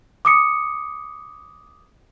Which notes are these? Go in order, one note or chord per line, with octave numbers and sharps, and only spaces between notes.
D6 D#6 C#7